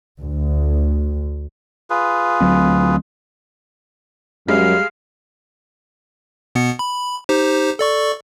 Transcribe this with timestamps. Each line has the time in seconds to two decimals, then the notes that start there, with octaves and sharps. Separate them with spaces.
0.19 D2
1.90 F4 G#4 B4
2.41 D2 F#3 C4
4.48 F#2 G3 G#3 F5
6.55 B2 B3 C#7
6.79 B5
7.29 D#4 G4 C5
7.79 A4 D5 C#6